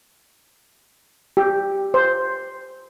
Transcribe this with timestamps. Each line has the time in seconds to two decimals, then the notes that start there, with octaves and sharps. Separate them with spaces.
1.37 G4
1.94 C5